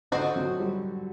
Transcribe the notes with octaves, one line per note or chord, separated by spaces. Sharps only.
D3 C4 F#4 C5 D#5
F#3
G3